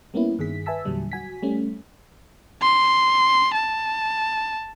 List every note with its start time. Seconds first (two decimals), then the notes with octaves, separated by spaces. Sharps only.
0.14 G3 A#3 B3 C#4 E4
0.39 G2 D#3 G#4 B6
0.66 B4 E5 G#5 A5 E6 B6
0.85 E2 A#2 D3 F#3 G3
1.12 F#4 G#5 B6
1.42 G3 A3 C#4
2.62 C6
3.54 A5